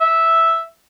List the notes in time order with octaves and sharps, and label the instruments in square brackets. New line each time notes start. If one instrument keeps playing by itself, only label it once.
[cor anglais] E5